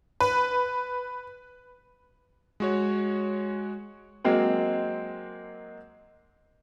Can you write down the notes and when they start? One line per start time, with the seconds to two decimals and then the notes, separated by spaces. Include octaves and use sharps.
0.20 B4
2.60 G#3 F#4 C#5
4.24 F#3 G#3 A#3 C4 C5